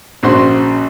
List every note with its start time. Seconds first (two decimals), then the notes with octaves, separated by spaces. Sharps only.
0.23 A#1 C#3 F#4 C5 C6